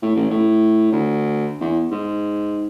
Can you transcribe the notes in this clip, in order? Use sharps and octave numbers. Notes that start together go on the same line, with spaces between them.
A2
A1
A2
D2
E2
G#2